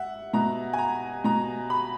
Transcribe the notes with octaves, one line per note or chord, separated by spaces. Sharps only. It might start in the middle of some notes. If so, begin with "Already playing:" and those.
Already playing: E5 F#5
B2 A#5
G#5
A#5
B2 A#5
B5